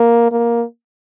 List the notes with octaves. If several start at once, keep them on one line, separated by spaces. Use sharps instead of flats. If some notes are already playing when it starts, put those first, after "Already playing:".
Already playing: A#3
A#3